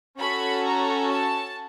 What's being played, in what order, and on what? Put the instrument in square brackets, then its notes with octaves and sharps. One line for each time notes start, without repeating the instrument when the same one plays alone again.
[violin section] C#4 F#4 A4 B5
A#5
A5